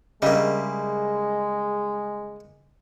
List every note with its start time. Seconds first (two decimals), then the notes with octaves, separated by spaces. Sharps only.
0.22 C#3 G3 G#3 A#3 D#5 E5